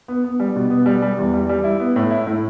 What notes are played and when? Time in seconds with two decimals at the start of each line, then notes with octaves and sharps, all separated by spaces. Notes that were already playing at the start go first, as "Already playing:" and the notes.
0.08 B3
0.24 B3
0.40 G3
0.56 B2
0.70 B3
0.86 G3
1.02 G3
1.18 E2
1.34 G3
1.49 G3
1.64 E4
1.80 B3
1.96 A2
2.11 E4
2.27 A2